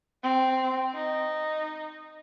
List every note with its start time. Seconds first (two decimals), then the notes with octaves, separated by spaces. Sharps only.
0.23 C4
0.94 D#4